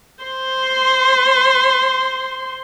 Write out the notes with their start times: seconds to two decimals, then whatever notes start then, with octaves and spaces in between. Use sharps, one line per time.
0.24 C5 C6